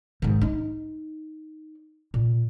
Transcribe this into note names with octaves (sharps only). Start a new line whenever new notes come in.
G#2 D#3
D#4
A#2